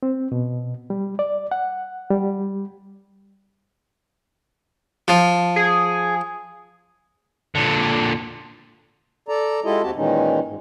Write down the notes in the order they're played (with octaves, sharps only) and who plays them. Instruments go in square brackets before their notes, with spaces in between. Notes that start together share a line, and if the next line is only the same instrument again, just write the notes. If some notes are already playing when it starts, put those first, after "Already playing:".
[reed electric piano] C4
B2
G3
D5
F#5
G3
[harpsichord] F3
[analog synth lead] G#4
[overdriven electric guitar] A#2 D3
[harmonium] A4 D5 A#5
G#3 E4 F4 G4 A4 D#5
D#2 C4 F#4 G4 A5
A#2 D#3 E3 G#3 C#4 D#4
G#2